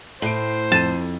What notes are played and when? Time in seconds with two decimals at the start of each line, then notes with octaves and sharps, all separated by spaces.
0.22 A2 C5 C7 D7
0.72 F2 A5 D#7